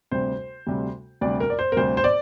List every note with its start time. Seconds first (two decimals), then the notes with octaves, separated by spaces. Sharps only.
0.11 D2 C3 G3 C5
0.67 D2 C3 G3
1.21 D2 C3 G3 D5
1.40 A#4
1.50 D5
1.59 C5
1.72 A#4
1.77 D2 C3 G3 C5
1.97 C5
2.04 D5